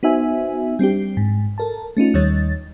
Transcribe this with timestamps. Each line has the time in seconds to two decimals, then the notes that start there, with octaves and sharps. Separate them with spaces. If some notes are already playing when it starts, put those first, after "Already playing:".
0.03 B3 D#4 F#4 C5 E5 G#5
0.79 G3 C4 D4 G4
1.17 G#2
1.58 A4 A#4 A5
1.97 A3 C#4 D#4 F4
2.14 D#2 D#3 G3 C#5 A6